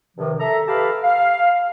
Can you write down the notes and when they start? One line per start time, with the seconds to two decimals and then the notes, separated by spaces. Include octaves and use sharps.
0.17 G2 C3 D#3 F3
0.40 A4 E5 A#5
0.68 G4 A4 B4 F5 A5 B5
1.03 F5